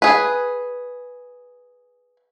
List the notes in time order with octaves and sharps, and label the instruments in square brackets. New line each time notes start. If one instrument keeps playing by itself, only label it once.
[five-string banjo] G#4 B4